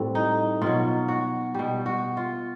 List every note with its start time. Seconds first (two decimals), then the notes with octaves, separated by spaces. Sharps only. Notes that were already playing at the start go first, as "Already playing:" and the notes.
Already playing: A2 G3 C4
0.15 D#4
0.62 B2 F#3 F4
1.08 F#4
1.54 B2 G3 G4
1.86 F#4
2.17 F4